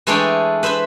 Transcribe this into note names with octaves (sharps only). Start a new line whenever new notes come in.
E3 G#3 A3 D4 C#5 G5
B4 C5 E5 B5